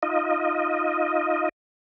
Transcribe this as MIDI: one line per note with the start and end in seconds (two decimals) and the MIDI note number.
0.03 1.49 63
0.03 1.49 65
0.03 1.49 75